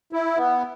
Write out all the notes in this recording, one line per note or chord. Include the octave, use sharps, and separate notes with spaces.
E4
B3